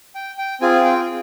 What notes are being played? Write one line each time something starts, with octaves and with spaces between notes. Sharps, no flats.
G5
G5
C4 F4 G#4 G#5
G5